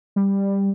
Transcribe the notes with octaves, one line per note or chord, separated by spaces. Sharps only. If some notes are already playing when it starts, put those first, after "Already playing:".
G3